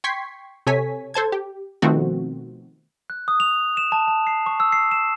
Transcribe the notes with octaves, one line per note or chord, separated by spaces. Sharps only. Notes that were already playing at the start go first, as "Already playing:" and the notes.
G5 C6 C#6 G#6 B6 C7
C3 A4 C#5 G#5 B6
A4 C5 A5 G#6
G4
B2 D#3 F3 A3 C4 F#4
F#6
D#6
F7
E7
A5
A5
C7
C#6
E6
C7
E7